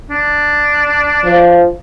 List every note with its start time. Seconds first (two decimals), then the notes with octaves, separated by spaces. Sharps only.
0.10 D4
1.25 F3